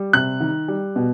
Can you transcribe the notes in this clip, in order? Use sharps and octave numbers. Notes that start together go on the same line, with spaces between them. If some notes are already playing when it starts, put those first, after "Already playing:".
Already playing: G3
C3 F#6
D#3
G3
B2